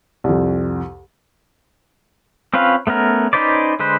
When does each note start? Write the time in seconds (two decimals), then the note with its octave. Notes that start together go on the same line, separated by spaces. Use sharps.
0.24 C2 F2
2.54 C4 C#4 F4 B4 F5
2.87 A3 B3 C#4 A#4
3.33 C#4 D#4 B4 C5 D5
3.80 D3 G#3 B4 C5